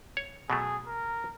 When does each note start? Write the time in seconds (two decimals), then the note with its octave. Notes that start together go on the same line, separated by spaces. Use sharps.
0.17 C#5
0.50 B2 F#3 A3 G#4
0.87 A#4